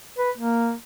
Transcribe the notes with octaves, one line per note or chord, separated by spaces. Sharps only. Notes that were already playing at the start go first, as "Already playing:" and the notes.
B4
A#3